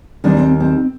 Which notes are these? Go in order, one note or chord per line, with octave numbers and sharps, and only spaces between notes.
D#2 D#3 G3 C4 D4
C4
C4